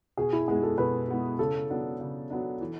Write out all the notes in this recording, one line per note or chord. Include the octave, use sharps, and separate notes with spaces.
B2 G#4
E4
G#3 B3 E4 G#4
A4
B2 B4
G#3 B3 E4
C#3 A4
F#3 B3 D4
C#3
F#3 B3 D4
E3